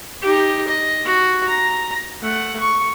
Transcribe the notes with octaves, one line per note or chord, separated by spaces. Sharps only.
D#4 G4
D#5
F#4
A#5
A3 F#5
C#6